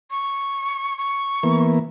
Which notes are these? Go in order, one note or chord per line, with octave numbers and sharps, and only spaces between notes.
C#6
C#6
E3 A#3 B3